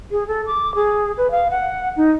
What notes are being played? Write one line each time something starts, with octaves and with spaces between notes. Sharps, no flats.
G#4
A4
D6
G#4
B4
F5
F#5
D#4